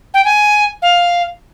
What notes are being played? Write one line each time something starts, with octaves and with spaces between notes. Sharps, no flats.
G5
G#5
F5